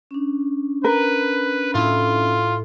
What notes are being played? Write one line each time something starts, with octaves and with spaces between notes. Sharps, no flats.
C#4 D4
A#4 B4
A2 E4 F4